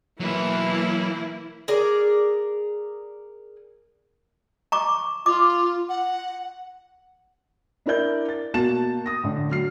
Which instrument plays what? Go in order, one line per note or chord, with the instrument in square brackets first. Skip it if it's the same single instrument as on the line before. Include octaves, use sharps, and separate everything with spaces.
[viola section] E3 A#3 E4 [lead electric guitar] F#3 B4
[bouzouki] G#4 A#4 D5
[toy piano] A#5 C#6 D6
[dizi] F4 [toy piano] D6
[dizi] F#5
[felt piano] D4 E4 A#4 D5 G6
A6
B2 A#3 F#4 A5 A6 E7
D#6 A#6
A2 D3
F#3 F6 C7